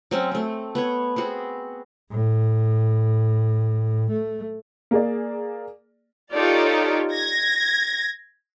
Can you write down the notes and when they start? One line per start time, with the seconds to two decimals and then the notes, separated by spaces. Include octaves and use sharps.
0.11 F#3 C4 C#4
0.31 A3 C4
0.75 B3 B4 C#5
1.16 B3 C4 F#4 G#4
2.11 A2
4.11 A3
4.91 A#3 G#4 D5
6.34 D#4 F4 G4 A4 C#5 D5
7.14 G#6 A#6